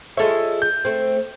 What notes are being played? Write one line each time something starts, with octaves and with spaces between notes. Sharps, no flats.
G#3 F4 A4 C#5 E5
G6
A3 C4